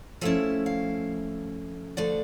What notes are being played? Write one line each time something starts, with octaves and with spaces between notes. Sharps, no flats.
F3 A3 C#4 E4 E5
F5
D3 F3 A3 D5